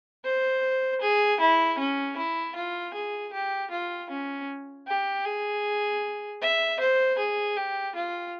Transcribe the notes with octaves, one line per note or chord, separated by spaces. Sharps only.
C5
G#4
E4
C#4
E4
F4
G#4
G4
F4
C#4
G4
G#4
E5
C5
G#4
G4
F4